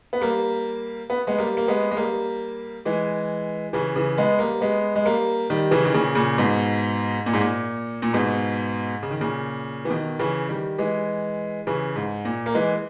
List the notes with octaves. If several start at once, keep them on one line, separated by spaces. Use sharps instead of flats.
B3
G3 A#3
B3
G#3 B3
G3 A#3
A#3
G#3 B3
G#3
G3 A#3
E3 G#3
C#3 E3
C#3 E3
G#3 B3
G3 A#3
G#3 B3
G#3
G3 A#3
D#3 G3
C#3 E3
D#3
A#2 C#3
A#2 C#3
G#2 B2
A#2
G#2
A#2
A#2
G#2 B2
C#3
D#3
A#2 C#3
E3
B2 D#3
C#3 E3
D#3 G3
E3 G#3
C#3 E3
G#2
A#2
A#3
E3 G#3